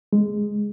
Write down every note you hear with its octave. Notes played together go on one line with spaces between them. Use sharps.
G#3